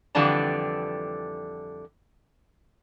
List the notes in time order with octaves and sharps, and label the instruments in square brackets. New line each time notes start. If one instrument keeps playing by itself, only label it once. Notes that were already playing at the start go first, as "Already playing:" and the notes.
[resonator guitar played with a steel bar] F2 D3 E3 G3 D4 A5